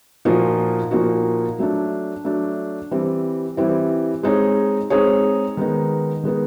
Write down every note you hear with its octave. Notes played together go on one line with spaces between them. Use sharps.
A#2 F3 A#3 D#4 F#4
A#2 F3 A#3 D#4 F#4
F#3 A3 D4
F#3 A3 D4
E3 G3 C4 E4
E3 G3 C4 E4
G#3 C4 D#4 G#4 C#5
G#3 C4 D#4 G#4 C#5
D#3 G#3 B3 D#4
D#3 G#3 B3 D#4